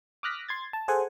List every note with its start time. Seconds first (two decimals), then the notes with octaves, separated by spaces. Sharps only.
0.23 D6 D#6 F6 F#6 A#6 B6
0.48 C6 G#6 A6
0.73 A5
0.88 G#4 A4 C5 F#5 G#5